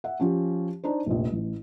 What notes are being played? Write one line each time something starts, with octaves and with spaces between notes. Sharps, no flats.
E5 F#5
F3 C#4 G4
D4 D#4 C5
F1 A#1
A1